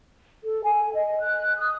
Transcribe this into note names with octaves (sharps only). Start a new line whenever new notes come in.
A4
G#5
D#5
F#6
D#6